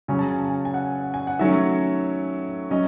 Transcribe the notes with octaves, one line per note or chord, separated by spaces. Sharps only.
C#3 F#3 C#4 G#5
A5
G#5
A5
G#5
G#5
F#5
G#5
F#5
D#3 F#3 A3 C#4 E5
F#3 C#4 D#5